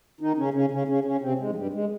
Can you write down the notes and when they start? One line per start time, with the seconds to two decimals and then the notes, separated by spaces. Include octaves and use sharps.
0.20 D#3 D#4
0.38 C#3 C#4
0.54 C#3 C#4
0.72 C#3 C#4
0.88 C#3 C#4
1.05 C#3 C#4
1.21 C3 C4
1.39 G#2 G#3
1.50 F3
1.55 G2 G3
1.73 G#3